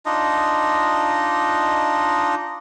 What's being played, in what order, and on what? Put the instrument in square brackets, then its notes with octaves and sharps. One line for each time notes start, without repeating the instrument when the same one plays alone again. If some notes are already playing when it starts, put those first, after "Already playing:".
[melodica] D4 D#4 F4 D#5